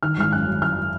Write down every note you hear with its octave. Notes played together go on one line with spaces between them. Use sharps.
D#3 F6
G#1 F6
F#2 F#6
F#3
G#1 F6
F#3